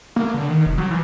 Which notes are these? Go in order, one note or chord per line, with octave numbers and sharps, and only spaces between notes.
A#3
D3
D#3
F1
F#3
E3